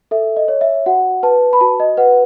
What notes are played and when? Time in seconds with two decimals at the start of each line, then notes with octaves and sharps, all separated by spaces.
0.11 A4 E5
0.37 D#5
0.48 C#5
0.61 E5
0.86 F#4 F#5
1.23 B4 A5
1.53 B5
1.61 F#4 A5
1.80 D#5
1.97 B4 F#5